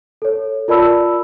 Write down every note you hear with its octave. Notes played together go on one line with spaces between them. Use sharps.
A4 C#5
F4 A#4 D5 A5 B5 E6